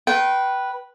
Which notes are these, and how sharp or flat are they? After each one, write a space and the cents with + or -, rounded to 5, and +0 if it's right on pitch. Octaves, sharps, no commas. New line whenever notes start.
B4 -10 G5 -25 C6 +40